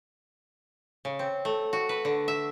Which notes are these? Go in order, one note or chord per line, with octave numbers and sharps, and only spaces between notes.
C#3
C4
A3
F#4
B4
D3
E5